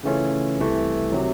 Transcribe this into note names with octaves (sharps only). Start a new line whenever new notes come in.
C#3 E3 A3 C#4 F4
C2 C3 E3 A3
C3 D#3 F#3